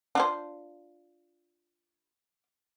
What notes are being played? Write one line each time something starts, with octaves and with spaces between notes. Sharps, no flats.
D4 F4 C5